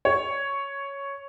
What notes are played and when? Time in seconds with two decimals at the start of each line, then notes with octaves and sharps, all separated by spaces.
0.05 C#5